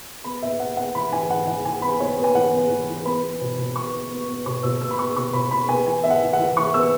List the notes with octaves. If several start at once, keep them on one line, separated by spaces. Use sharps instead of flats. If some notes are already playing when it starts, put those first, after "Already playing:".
B3 B5
B3 E5
B3 F#5
B3 F#5
E3 B5
E3 G#5
G#5
E3 F#5
E3 F#5
E3 G#5
B3 B5
B3 C#5
B3
G#5
E3 F#5
B3
E3
E3
B3 B5
B3
B2
B2
B3 C#6
B3
B3
B3
B2 C#6
B2 E6
B3 E6
B5
B3 C#6
B2 C#6
B2 B5
B2 B5
B3 G#5
E3 G#5
B3 E5
F#5
E3
F#5
E3
E3 C#6
B3 E6